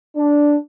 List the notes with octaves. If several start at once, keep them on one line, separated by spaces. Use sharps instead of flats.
D4